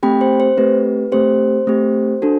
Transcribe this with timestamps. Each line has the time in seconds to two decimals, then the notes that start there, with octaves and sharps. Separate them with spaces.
0.03 A3 C4 G4 G5 B5
0.21 C5
0.40 C5
0.57 A3 C4 G4 B4
1.12 A3 C4 G4 C5
1.67 A3 C4 G4
2.22 D4 F#4 A4